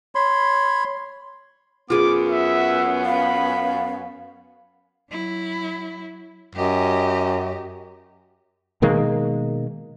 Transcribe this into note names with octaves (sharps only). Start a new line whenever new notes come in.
C#5 B5 C6
F#2 B3 F4 G#4 D6
E5
F5 B5
F#3 E4
F#2 G4 D#5
B2 D#3 G#3 A#3